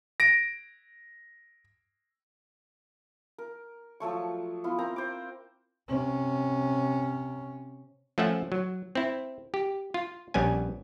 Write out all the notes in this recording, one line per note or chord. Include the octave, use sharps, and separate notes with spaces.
A#6 D7
A#4
F3 F#3 A3 C#6
B3 E4 F4
C4 A#4 A#5
C5 D6
C3 C#4
F3 A3 C#4 E5 F#5
F#3
C4 E4
G4
F4
A#1 G3 B3 C#4 G#5